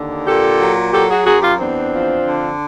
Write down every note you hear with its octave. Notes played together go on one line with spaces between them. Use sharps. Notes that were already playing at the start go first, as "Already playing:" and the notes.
Already playing: D#2 D3
A#2 G4 A4
F#3
F#3 G4 A4
F#4 G#4
F#2 F#4 G#4
F4 G4
E2 C4 D4
F3
D3